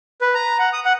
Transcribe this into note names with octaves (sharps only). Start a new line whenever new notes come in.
B4
A#5
F#5
D#6
F#5